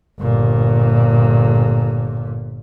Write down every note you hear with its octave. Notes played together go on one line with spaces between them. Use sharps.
G1 A#2